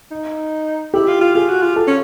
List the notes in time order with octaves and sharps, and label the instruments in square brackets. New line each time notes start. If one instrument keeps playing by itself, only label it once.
[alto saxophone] D#4
[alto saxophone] E4 [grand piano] G4
[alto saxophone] F4
F4
[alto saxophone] F4 [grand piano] G#4
[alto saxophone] F#4
F4
[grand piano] A4
[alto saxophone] C#4